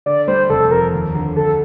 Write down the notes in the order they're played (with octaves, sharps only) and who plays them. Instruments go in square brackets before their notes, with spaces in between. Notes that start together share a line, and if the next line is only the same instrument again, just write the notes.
[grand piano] D3 [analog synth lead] D5
[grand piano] G3 [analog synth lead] C5
[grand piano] F1 [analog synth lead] A4
[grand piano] F2 [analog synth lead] A#4
[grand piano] D#2
D3
[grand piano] D2 [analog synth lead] A4